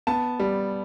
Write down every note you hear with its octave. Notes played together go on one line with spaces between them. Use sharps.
B3 A5
G3